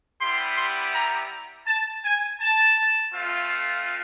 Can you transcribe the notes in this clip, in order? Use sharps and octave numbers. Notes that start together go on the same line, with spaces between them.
G3 B3 E4 G4 C6
C6
A#5
A5
G#5
A5
A3 C4 F4